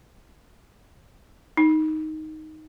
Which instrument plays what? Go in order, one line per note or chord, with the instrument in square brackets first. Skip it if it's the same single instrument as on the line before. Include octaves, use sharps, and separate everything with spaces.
[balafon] D#4